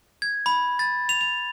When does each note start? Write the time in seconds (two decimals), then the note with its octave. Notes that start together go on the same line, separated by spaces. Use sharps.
0.22 G#6
0.46 B5
0.79 A6
1.09 F7
1.21 F7